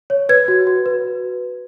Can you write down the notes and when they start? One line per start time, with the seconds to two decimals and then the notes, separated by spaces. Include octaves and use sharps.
0.10 C#5
0.29 B4 G#6
0.48 F#4
0.67 F#4
0.86 B4